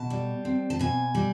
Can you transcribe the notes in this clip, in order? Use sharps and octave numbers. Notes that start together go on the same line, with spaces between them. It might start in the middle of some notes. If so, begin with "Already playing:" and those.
Already playing: B2 A5
G3
C4
A5
B2 G#5
G3